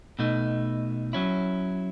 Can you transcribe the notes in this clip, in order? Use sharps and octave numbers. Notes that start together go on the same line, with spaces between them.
B2 A3 D#4
F#3 C#4 E4